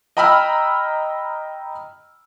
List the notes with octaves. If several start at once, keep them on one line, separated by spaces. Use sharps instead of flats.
D#5 G5 A#5 B5 E6 F6